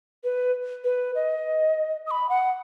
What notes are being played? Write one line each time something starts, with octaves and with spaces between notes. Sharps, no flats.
B4
B4
D#5
D#6
B5
F#5